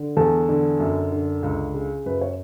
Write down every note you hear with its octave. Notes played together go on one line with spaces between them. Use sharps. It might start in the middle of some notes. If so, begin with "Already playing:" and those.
Already playing: D3
E2 A4 A5
D3
F#2
D3
C#2
C#3
F#2 B4
C#5